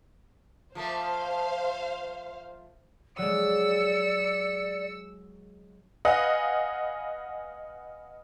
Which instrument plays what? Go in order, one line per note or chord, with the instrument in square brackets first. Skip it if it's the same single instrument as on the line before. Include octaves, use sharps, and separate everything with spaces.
[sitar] F3 A3 A#3 [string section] C5 F5
[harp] F#3 G#3 [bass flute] D5 [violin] E6 C#7
[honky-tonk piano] B4 D#5 F5 F#5 G#5